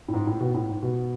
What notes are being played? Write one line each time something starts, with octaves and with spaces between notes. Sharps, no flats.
A2
G#2
A2
B2
A2
G#2
B2